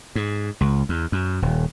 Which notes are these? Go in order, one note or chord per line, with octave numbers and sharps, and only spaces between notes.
G#2
C#2
E2
F#2
D#1